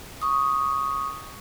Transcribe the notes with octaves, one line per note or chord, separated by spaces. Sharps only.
C#6 D#6